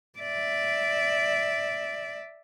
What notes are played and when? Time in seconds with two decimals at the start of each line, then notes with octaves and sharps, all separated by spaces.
0.19 D5 E5